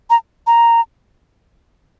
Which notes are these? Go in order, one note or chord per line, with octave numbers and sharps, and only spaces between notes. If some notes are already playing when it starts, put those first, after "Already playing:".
A#5
A#5